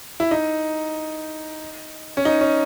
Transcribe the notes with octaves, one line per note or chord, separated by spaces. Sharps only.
E4
D#4
C#4
D#4
C#4